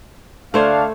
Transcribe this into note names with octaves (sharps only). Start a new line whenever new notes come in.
D2 A3 D4 C5 C#5 F5